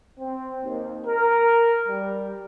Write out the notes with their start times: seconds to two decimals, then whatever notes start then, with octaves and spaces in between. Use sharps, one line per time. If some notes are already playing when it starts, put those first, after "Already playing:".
0.20 C4
0.64 D#2
1.06 A#4
1.87 G3